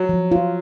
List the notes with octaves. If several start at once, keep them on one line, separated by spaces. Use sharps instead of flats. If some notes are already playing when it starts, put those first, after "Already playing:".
Already playing: F#3
F3
F4